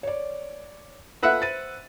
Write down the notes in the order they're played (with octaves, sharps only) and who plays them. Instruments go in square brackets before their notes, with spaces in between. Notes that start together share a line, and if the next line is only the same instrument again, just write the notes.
[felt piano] C#5 D5
[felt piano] F4 A4 [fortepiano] B4 E5 F#5
[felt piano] C5 A6 D#7